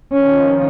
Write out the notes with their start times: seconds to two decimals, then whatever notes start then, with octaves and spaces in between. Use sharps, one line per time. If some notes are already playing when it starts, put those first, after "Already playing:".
0.12 D#3 F3 C#4